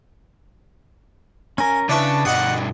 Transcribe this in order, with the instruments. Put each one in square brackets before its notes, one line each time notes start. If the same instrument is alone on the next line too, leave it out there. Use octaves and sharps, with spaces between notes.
[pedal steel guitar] C#4 A#4 [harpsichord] G#5
[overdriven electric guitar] C#3 [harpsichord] D4 E4 B4 [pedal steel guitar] D5 C#6 [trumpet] A5
[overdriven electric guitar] G2 B2 [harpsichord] D#5 D#6 [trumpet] F#5